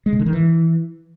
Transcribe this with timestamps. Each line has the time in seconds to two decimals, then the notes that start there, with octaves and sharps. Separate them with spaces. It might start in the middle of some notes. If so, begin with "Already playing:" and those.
0.06 G#3
0.13 C#3
0.19 D3
0.26 D#3
0.33 E3